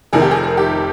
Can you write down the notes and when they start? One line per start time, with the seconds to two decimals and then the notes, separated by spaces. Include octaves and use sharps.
0.13 F1 F2 C3 D#3 G#4
0.22 G4
0.31 G#4
0.57 G4